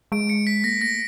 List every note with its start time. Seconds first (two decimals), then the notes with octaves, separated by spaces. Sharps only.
0.12 G#3 D7
0.29 C#7
0.47 B6
0.64 A#3 A#6
0.81 A3 A#6